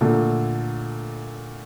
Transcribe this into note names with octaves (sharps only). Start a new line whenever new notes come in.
A#2 D3 A3